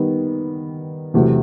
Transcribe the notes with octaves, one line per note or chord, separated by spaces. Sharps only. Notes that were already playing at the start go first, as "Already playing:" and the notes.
Already playing: D#3 G3 B3
E2 C3 F#3 A3